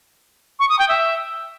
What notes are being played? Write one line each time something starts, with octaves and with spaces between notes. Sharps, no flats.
C#6
D#6
G5
E5